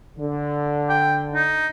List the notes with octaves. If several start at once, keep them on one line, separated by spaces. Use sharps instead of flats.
D3
G5
D#4